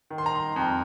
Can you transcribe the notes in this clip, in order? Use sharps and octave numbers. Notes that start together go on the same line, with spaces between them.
D#3
C6
A#5
C6
F2